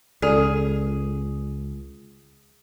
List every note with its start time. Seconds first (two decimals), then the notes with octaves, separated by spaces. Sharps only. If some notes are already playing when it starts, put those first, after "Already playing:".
0.22 C#2 G#4 A4 D5